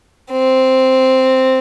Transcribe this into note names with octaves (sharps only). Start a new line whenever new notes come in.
C4